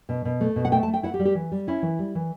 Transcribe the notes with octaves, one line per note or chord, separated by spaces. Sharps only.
B2
B2
A3
B2
F#5
A3 G5
A5
A3
G5
E4 F#5
G4
G3
G4
E3
G3
C#4 E4
E3
G3
E3